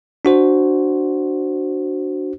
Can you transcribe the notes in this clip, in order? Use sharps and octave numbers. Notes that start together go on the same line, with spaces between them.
D4 F#4 C5